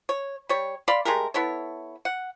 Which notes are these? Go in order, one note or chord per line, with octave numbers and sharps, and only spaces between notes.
C#5
G3 C#5
D5 F5 B5 C6
G#3 A3 G4 A#4
B3 E4 A4 C#5
F#5